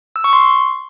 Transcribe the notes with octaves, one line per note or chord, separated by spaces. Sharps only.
E6
C#6
C6